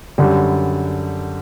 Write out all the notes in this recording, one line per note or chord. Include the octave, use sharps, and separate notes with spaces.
F#2 D3 G3